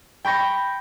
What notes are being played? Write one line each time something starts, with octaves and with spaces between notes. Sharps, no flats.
G5 B5 C#6 A#6 C#7